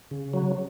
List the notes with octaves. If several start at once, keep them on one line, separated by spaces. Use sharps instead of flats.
C#3
F#3